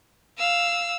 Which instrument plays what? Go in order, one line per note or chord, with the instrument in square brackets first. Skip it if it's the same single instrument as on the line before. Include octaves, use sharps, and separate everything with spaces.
[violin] F5 E6